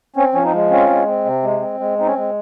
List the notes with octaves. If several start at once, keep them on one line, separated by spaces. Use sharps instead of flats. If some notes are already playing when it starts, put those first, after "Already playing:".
C4 C#4
F3 C#4
C4 D#4
G#3
C4 C#4 F4
G#3
C4
C3
G#3
C4
G#3
C4 D#4
C#4
G#3